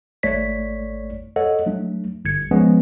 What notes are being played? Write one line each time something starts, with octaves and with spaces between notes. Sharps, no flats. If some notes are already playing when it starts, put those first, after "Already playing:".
G#1 A3 C#5 D5 B6
A4 C#5 D#5 F#5
F#3 A3 D4
G1 G#6 C#7
F3 G#3 B3 C#4